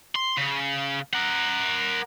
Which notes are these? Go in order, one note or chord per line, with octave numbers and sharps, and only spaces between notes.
C6
C#3
A#4 F#5